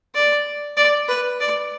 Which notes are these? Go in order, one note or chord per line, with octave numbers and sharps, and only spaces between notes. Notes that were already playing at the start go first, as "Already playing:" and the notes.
D5
D5
B4
D5